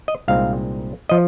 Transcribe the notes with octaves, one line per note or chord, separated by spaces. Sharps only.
D#5
C2 A#2 G#3 C4 D#4 F5
F3 D#5